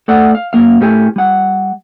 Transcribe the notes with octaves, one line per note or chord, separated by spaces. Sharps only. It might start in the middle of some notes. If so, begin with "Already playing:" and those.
A3 A4 D5 F#5
F5
F#2 A#3 F5
A2 A3 C4 G4 A#4 G#5
G3 F#5